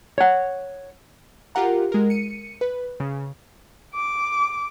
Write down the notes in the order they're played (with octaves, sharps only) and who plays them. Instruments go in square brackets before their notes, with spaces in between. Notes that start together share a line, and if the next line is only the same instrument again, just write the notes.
[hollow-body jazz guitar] C#5 F#5
[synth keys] F4 G4 A#4 F#5 A#5
G#3 A#4
C#7 D#7
B4
C#3
[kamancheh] D6